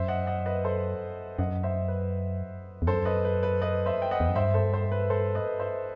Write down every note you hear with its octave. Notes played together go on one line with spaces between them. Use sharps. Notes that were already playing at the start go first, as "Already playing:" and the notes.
Already playing: F#2 C5 E5
D#5 F#5
D#5 F#5
B4 D#5
A4 C5
F#2 D#5 F#5
C5 E5
B4
E2
F#2 A4 C5
B4 D#5
B4
B4
B4 D#5
C5 E5
G5
D#5 F#5
E2
F#2
G2 C5 E5
A4 C5
A4 C5
B4
A4 C5
B4 D#5
C5 E5